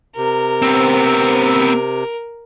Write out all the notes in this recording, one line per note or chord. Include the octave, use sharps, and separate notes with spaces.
C3 A#4
B3 C4